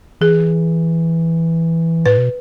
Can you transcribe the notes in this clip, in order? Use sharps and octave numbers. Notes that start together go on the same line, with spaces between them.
E3 G#4
A2 B4
B2